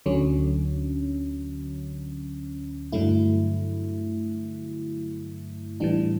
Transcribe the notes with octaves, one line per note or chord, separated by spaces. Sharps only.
D2 D3 F#3 C#4
G2 D3 F#3 A3 E4
A2 E3 G3 D4